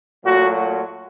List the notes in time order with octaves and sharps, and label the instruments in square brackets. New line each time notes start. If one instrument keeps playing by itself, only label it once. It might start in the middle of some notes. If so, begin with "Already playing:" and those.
[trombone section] A#2 F#3 A3 F#4